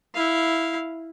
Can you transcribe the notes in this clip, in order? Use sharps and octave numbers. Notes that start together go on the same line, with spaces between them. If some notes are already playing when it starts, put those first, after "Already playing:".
E4 F5